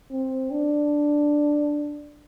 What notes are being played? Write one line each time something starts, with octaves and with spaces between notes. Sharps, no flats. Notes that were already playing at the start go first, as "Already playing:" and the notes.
C4
D4